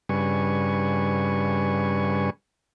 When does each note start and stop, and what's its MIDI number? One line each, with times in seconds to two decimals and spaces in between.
0.09 2.30 43
0.09 2.30 49
0.09 2.30 55
0.09 2.30 71
0.09 2.30 80
0.09 2.30 85